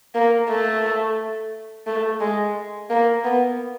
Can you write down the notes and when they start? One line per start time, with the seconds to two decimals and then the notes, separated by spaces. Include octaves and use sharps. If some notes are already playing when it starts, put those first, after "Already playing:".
0.15 A#3
0.49 A3
1.87 A3
2.21 G#3
2.90 A#3
3.24 B3